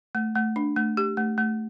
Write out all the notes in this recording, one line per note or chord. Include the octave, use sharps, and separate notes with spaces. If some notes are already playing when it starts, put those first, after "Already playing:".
A3
A3
D4
A3
G4
A3
A3